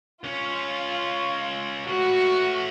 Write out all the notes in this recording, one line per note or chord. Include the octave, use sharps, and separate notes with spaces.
C#2 C#4 F4
A2 F#4 B4